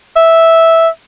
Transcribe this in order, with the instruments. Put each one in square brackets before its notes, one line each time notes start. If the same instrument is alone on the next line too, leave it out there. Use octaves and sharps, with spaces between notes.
[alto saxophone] E5